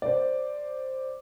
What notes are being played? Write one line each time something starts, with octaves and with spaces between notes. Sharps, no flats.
C5 D5